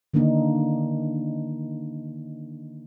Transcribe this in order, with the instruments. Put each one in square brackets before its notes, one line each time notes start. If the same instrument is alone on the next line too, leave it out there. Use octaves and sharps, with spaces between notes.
[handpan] D3 D#3 A#3 D4 D#4